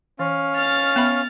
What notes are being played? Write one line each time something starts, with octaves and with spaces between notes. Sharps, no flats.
E3 C#4 F5
F6 A6
B3 E5 B5